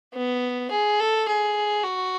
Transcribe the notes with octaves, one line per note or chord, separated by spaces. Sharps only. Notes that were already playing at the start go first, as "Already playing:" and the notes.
B3
G#4
A4
G#4
F#4